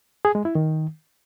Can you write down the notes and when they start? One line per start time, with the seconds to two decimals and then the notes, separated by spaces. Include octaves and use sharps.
0.25 G#4
0.35 G#3
0.45 E4
0.55 D#3